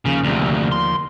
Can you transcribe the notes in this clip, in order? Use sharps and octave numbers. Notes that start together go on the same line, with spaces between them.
D#2 C#3 F3 A#3
D2 C3
C6